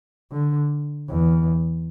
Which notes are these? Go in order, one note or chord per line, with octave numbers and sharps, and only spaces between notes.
D3
E2